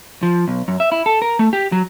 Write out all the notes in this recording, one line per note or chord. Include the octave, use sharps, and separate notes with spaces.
F3
B1
F#2
E5
E4
A4
A#4
A3
G4
F#3